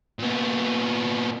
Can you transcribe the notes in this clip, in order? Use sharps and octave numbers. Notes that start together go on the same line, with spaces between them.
A#2 B3